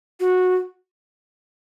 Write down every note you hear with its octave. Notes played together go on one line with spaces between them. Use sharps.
F#4